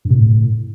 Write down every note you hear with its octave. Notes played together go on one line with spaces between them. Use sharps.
G2
C3
A2